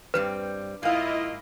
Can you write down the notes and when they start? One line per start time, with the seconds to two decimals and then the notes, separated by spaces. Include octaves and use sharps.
0.14 G2 G3 C4 B4
0.83 G#2 A#3 E4 F4 D#5 F5